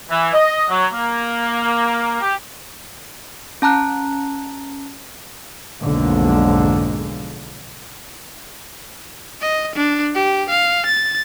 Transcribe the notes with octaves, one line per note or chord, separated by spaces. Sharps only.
E3
D#5
F#3
A#3
G4
C#4 A5 A#5 F#6
B1 F2 G#2 D3 G#3 A#3
D#5
D4
G4
F5
A6